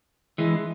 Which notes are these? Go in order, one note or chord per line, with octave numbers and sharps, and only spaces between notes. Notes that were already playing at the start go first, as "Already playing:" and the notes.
E3 G#3